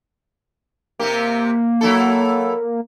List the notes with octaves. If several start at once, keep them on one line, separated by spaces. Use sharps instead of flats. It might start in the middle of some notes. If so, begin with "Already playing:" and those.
C3 A#3 C4 G4
F#3 E4 A4